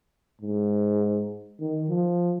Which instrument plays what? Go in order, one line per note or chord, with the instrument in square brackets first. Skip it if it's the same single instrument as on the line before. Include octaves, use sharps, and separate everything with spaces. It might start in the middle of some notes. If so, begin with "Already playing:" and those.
[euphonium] G#2
D#3
F3